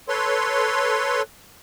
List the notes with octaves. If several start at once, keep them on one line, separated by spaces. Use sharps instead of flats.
A4 B4 C#5 C6